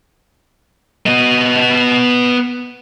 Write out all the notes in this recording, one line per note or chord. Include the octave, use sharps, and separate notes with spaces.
B3 D#5